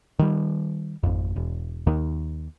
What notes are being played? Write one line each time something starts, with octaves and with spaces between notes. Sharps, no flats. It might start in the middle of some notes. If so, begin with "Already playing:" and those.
D#3 G3
G#1 F2
E1
D#2 D#3